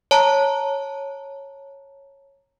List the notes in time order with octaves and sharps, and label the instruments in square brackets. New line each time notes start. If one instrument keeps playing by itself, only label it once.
[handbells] C#5 A5 A#5